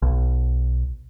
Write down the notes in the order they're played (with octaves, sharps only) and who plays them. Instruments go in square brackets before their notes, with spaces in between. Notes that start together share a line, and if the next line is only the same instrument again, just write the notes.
[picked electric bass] B1